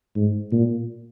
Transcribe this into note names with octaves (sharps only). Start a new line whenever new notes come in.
G#2
A#2